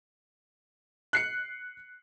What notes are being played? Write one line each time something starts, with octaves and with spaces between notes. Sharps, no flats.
F#6 C7 C#7